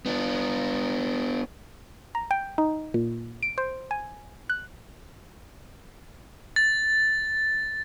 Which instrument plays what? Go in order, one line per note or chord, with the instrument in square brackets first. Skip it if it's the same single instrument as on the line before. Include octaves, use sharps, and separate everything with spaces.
[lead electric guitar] B3 D4
[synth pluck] A#5
G5
D#4
A#2
D7
C5
G#5
F#6
[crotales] A6